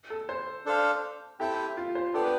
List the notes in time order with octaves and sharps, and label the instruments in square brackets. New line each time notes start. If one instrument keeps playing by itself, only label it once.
[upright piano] A4
C5
[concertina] D4 A4 C5 F5
[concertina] C4 E4 A4 E5 G5 [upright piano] G4
[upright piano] F4
C5
[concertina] B3 D4 G4 D5 G5 [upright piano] A4
[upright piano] B4